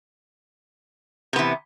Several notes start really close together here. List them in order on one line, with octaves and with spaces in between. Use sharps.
C3 B3 E3